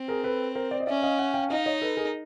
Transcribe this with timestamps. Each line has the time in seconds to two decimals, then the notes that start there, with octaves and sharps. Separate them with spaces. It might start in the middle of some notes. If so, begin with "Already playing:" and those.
Already playing: C4
0.08 G#4 A#4
0.23 A4 B4
0.55 A#4 C5
0.71 C5 D5
0.80 D#5
0.87 C#4 D5 E5
1.02 D#5 F5
1.19 E5 F#5
1.34 F5 G5
1.50 D#4 D#5 F5
1.66 C#5 D#5
1.81 A4 B4
1.97 G#4 A#4